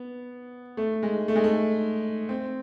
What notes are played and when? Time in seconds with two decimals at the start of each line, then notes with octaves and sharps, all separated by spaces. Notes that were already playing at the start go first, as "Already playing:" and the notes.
Already playing: B3
0.77 A3
1.03 G#3
1.28 A3
1.35 G#3
1.44 A3
2.29 C4